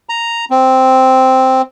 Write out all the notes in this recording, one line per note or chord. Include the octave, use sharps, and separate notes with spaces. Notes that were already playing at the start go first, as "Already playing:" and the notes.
A#5
C4